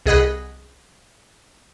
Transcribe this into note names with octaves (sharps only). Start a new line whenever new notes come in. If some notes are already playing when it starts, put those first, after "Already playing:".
C2 G#4 D#5 F#5 B5